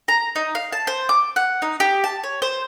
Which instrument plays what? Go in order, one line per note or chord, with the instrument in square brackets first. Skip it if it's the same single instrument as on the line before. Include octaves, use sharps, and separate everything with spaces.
[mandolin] A#5
D#4
F5
A5
C5
D6
F#5
D#4
G4
A5
C#5
C5